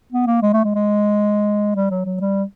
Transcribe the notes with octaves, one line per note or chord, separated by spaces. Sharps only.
B3
A#3
G#3
A3
G#3
G#3
G3
F#3
F#3
G3